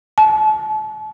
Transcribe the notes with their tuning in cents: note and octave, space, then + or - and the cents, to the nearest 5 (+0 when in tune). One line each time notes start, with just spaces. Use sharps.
A5 -35